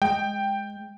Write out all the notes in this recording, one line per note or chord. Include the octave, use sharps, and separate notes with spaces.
G#3 G5